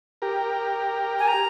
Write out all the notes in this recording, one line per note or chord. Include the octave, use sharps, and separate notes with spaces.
G4 A#4
G#5
A#5